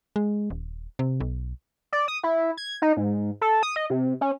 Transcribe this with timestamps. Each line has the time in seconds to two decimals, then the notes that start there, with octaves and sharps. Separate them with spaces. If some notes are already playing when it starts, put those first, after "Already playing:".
0.16 G#3
0.50 D#1
0.99 C3
1.20 B1
1.93 D5
2.08 D#6
2.23 E4
2.57 G#6
2.82 D#4
2.97 G#2
3.41 A4
3.63 D#6
3.76 D#5
3.90 C3
4.21 C#4